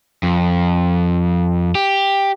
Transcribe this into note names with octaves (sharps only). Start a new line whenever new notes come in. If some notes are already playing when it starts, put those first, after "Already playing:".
F2
G4